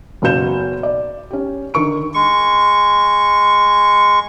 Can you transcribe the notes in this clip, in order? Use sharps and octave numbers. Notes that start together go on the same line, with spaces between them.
F#1 B2 F#4 F5 G6 E7
D5
C#4 G4
D3 D#3 A#4 C#6 D7
G#3 C#6